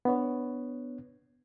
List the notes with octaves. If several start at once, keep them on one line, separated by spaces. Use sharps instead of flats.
B3 D4 C#5